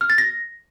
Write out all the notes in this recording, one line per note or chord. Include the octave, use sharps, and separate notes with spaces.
F6
A6
A#6